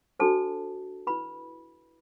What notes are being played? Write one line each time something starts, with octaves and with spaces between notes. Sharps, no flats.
D4 F#4 A4 C5 A5
E4 B4 B5